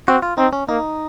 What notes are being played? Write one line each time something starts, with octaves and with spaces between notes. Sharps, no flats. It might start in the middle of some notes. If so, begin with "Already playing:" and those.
C4 F#4
F4
C4 D#4
C#4
A#3 D#4